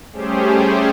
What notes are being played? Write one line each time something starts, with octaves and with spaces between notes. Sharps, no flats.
G3 A3 C#4 G4 G#4 C5